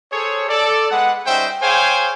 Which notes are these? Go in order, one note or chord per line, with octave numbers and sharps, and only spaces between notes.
G#4 A4 C5 C#5
A4 D5
G#3 B3 B4 F#5
G3 C#4 D#4 C5 E5 G5
G#4 C5 C#5 F5 G5 G#5